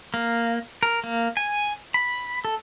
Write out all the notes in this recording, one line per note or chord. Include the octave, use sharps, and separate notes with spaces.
A#3
A#4
A#3
G#5
B5
A4